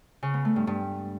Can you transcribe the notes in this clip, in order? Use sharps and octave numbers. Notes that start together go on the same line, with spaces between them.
C#3
B3
A3
G2
G2